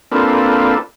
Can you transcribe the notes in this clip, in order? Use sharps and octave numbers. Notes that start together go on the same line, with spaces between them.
A#3 C4 D4 F4 A4 B4